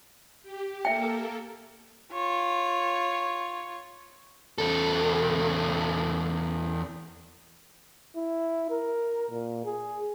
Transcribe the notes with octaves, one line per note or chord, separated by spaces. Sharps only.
G4
A#3 A4 A#4 E5 G5
F4 C#5
E2 A4
E4
A#4
A#2
G#4